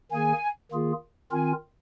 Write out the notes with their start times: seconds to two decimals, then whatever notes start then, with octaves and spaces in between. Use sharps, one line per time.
0.11 D#3 A#3 G#4 G#5
0.71 D#3 A#3 F4 G#4
1.31 D#3 C4 F4 A#4 G#5